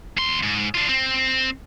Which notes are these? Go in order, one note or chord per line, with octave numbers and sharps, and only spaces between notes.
D#2 C6
G#2
D4 F4
C4